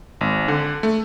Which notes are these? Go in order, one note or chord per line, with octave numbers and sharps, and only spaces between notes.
G#1
D3
A3